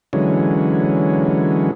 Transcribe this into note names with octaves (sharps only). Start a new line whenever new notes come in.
D3 E3 F#3 G#3 C#4